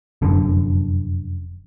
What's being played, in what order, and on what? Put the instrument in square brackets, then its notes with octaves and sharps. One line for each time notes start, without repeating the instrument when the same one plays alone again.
[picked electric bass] F1 F#2 D3